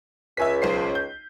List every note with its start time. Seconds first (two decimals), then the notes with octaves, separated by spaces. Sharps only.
0.37 C#2 E5 G#5 B6
0.62 B1 C5 C7
0.95 G6